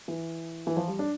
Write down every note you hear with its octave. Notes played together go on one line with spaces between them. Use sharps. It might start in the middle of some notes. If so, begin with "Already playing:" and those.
E3
E3
F3
G3
D4